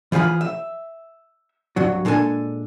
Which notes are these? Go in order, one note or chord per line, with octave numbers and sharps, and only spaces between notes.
E3 F3 G#4 F5 B5
E5
C2 G2 F#3 F#4
A#2 G#3 D4 A4 G#5